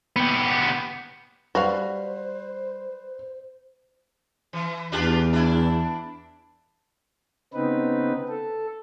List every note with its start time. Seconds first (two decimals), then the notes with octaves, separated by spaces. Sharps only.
0.16 B3 G4
1.55 G3 F#4 B4 C5 F5
4.53 E3
4.92 E2 D4 F4 G4
5.33 D4 E4
7.54 C#3 B3 C4 D#4 B4
8.28 A4